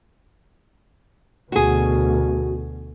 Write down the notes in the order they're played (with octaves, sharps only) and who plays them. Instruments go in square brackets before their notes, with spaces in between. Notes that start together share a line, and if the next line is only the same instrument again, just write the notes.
[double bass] D2 B2 [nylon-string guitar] F#4 G#4